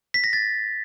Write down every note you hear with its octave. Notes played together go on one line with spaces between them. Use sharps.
B6
A#6
A6